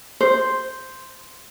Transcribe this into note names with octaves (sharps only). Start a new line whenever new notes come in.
C5